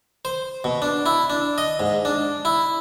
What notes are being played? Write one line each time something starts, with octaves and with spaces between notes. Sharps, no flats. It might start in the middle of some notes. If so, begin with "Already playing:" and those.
C5
B2
D4
E4
D4
D#5
G#2
D4
E4